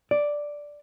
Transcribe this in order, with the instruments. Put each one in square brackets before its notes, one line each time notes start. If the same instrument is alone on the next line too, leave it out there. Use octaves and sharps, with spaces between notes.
[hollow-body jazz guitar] D5